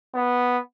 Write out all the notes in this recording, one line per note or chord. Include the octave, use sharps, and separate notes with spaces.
B3